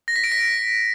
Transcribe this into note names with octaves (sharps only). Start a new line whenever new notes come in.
A#6
B6
D7
B6